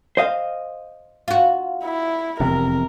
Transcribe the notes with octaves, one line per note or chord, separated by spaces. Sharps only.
C5 D#5 F5
F4 F#4
E4
F1 E2 C3 A#4